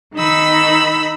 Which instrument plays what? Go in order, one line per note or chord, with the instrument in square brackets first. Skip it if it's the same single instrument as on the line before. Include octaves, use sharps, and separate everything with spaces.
[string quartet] D#3 D#4 B5 E6